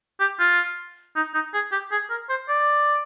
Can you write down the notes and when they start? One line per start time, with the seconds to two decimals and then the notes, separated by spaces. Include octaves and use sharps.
0.20 G4
0.40 F4
1.16 D#4
1.34 D#4
1.54 G#4
1.72 G4
1.92 G#4
2.10 A#4
2.29 C5
2.49 D5